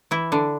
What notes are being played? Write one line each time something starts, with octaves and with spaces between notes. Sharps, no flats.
E3 E4
D3 D4